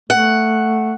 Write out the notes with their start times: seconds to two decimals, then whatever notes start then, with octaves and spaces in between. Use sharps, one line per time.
0.10 A3 F#5